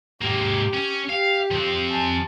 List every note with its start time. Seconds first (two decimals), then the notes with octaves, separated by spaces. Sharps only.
0.21 G#2 A#3 G4
0.74 C#4
1.10 G4 F5
1.51 F3 C4
1.89 G#5 A5